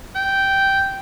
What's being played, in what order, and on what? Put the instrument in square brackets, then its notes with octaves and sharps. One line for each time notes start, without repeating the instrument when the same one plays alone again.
[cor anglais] G5